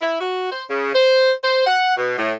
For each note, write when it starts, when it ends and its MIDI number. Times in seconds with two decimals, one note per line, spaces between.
0.02 0.17 64
0.20 0.50 66
0.52 0.64 72
0.69 0.94 49
0.95 1.32 72
1.44 1.64 72
1.66 1.94 78
1.97 2.16 47
2.18 2.33 45